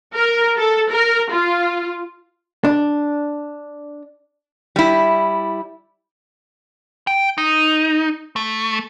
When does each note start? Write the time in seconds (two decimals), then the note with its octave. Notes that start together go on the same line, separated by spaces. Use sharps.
0.14 A#4
0.56 A4
0.90 A#4
1.30 F4
2.65 D4
4.76 G3 E4
7.07 G5
7.38 D#4
8.36 A3